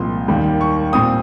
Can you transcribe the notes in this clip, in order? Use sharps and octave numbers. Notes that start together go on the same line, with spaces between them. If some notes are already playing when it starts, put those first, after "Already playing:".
Already playing: C2 A#2 F3 G#3 C6
D#2 D#3 G3
C#6
A#2 G3 C4 D#6